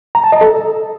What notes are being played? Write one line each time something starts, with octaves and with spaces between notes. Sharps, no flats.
A#5
A5
D#5
A4